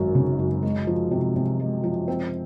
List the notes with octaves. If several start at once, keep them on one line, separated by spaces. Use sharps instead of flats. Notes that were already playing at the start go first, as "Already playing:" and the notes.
Already playing: G#1 F#2 F#3
C#3
F#2
G#3
F3
C3
C3
G#3
F3
C4